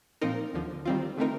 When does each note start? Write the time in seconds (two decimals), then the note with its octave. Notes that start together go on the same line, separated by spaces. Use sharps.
0.21 A#2 F3 C4 D#4 A#4
0.53 D#2 D3 F3
0.85 D#3 G3 C4 F4
1.18 D3 A3 C4 D#4 A#4